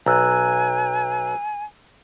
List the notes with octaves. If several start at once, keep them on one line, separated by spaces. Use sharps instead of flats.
B1 G#5 A#5 E6 F#6